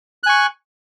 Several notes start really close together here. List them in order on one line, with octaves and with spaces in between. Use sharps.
F#6 G#5 C#6